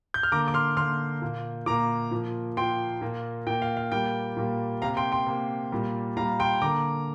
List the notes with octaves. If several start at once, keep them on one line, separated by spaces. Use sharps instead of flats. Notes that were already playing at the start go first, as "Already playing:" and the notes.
G6
F6
D3 A#3 A#5 D6
D6
C6 F6
D3 A#3 C6 F6
A#2 A#3
A#2 A#3 A#5 D6
A#2 F3 A#3
A#2 F3 A#3 G5 C6
A#2 A#3
A#2 A#3 G5
F5
F5
A#2 G3 A#3 G5
A#2 G3 A#3
C3 A#3 F5 A#5
G5 C6
G5 C6
C3 A#3
A#2 G3 A#3
A#2 G3 A#3 F5 A#5
G5 C6
D3 A#3 A#5 D6